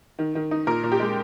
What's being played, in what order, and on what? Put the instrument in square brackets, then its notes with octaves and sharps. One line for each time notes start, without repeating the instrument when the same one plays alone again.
[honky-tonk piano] D#3
D#3
D#4
A#2 A#4
A#2
G4
G#3